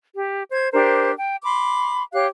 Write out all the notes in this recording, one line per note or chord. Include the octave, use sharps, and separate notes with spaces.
G4
C5 G#6
D4 G4 A#4 C5
G5
B5 C6 D6
G4 C#5 F5 F#6